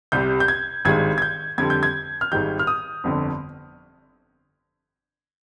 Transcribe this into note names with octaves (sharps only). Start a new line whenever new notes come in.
C2 C3 G3 G6
G6
G#6
G#1 G2 D#3 G#3 G#6
G#6
G6
F2 D3 G3 G#6
G6
G#6
F6
G#1 G#2 D#3 G3 G6
F6
D#6
G1 F2 D3